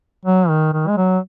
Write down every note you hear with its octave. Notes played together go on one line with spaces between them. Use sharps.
F#3
D#3
D#3
G#3
F#3